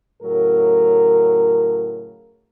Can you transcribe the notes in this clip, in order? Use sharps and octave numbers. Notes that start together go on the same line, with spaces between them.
A2 C#3 F#3 A#4